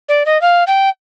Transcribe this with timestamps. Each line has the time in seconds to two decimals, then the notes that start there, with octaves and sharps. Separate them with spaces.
0.09 D5
0.26 D#5
0.41 F5
0.67 G5